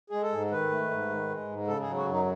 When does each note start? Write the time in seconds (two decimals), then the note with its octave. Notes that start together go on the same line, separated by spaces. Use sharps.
0.10 G#3 G#4
0.22 A4
0.32 G#2
0.51 D#3 B4
0.71 A3
0.91 G#2
1.09 D#3
1.29 G#3
1.48 G#2
1.67 C#3 A4
1.82 F#3 G#4
1.96 F#4
2.06 F#2 D#4